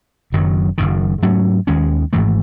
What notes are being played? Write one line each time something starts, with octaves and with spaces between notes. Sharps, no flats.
F#1 F#2 D#3 F#3
F#1 F#2 D#3
G#2 F#3 A3 C#4
D#2 D#3 G#3 C#4
G#1 G#2 E3 A3